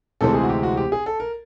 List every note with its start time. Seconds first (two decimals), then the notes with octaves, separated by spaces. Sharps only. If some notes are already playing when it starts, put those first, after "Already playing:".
0.21 D2 C3 E3 G#3 C4 A4
0.34 G#4
0.43 F#4
0.49 G4
0.63 F#4
0.77 G4
0.92 G#4
1.06 A4
1.20 A#4